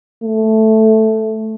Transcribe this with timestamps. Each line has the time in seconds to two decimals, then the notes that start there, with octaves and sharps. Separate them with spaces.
0.24 A3